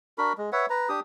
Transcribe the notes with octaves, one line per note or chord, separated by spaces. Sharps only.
D4 F#4 A#4 B5
G#3
B4 C#5 E5 F#5
B4 A#5
D4 G4 D#6